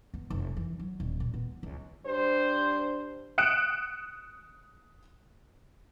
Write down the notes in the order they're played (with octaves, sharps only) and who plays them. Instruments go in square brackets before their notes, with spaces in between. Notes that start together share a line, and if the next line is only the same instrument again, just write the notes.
[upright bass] B3
F1
E3
F#3
D#1
A#2
B3
C#2
[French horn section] G3 D4 C5
[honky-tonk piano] D#6 F#6 C#7 D7 E7